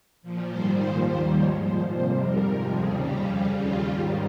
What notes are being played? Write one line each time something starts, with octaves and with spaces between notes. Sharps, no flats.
A#2 F3
G#2 D#3 G3 C5
A#2 F3 C5
D#2 D#3 G3 C5
G#2 F3 C#5
A#2 F3 C5
F2 C3 G3 C5
G#2 G3 A#4
F2 C3 F3
D#2 C#3 G3 G#4
F2 C#3 G3 G4
F2 C#3 G3 F4
D#2 C#3 G3 F4
G#2 D#3 G3